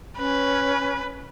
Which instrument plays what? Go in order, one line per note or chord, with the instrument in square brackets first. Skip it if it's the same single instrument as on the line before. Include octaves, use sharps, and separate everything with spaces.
[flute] C#4 [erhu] B4